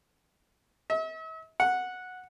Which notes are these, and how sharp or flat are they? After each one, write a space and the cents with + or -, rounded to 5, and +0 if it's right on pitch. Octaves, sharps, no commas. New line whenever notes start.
E5 -45
F#5 -10